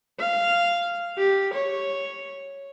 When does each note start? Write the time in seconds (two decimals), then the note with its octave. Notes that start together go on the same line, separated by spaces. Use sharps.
0.19 F5
1.18 G4
1.53 C#5